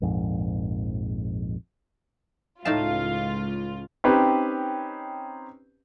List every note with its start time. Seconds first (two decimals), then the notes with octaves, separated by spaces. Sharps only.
0.02 A#1 F2 G#2
2.65 C#2 A2 D#4 F4 F5 A5
4.04 C4 C#4 D#4 G4 B4